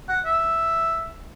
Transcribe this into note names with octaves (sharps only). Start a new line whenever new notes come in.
F#5
E5